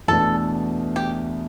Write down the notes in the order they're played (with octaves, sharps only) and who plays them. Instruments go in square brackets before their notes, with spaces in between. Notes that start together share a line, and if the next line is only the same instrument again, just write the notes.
[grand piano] E2 B2 A3 D4 [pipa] A4
[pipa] G4